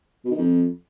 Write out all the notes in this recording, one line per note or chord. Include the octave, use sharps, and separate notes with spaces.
B2
D#3
F2